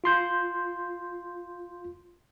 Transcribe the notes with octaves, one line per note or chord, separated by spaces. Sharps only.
F4 C6 G6